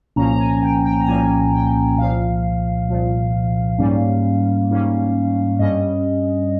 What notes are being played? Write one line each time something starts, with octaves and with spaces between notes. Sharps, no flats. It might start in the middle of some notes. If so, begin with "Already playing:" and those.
C2 A#2 F3 A#3 C#4 A#5
A#5
G#5
G5
G5
A#5
C2 A#2 F3 A#3 C#4 G#5
G5
C2 A#2 F3 F5
C2 A#2 F3
G#2 G3 A#3 C#4
G#2 G3 A#3 C#4
G2 G3 C#4 D#5